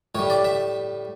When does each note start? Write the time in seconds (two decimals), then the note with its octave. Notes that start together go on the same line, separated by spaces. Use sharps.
0.15 A2 C#5
0.19 G3
0.30 D5
0.44 E5